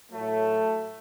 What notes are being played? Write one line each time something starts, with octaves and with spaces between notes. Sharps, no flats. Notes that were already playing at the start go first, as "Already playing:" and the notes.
A2 F#3 A3